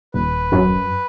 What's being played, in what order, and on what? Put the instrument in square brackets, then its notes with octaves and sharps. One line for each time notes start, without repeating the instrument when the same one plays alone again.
[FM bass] D#1 [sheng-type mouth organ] B4
[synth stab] F#2